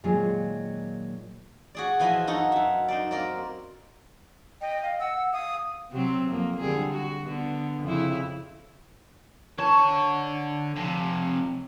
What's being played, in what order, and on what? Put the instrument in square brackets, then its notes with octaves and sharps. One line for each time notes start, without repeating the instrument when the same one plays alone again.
[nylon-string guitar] A#2 D#3 F#3 G#3 F4 G#4
[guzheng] F#4 G#4 D5
E3 F3 B4 D#5 E5 C6
F#2 D#4 F#4 A4
F#2 E5
D#4 C5 D5
A#3 C4 A#4 D5
[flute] D#5 [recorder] G5
[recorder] F5
[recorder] F#5 [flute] E6
[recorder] F5 [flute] D#6
[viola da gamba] C3 F#3 C4
F2 A#3
D3 G3 G#4
F#4
D3 B3
F2 C#3 E4
[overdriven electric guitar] D3 A5 [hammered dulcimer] C#5
[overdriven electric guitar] F2 C3